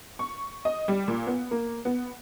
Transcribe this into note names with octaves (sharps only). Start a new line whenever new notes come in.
C#6
D#5
G3
A#2
B3
A#3
B3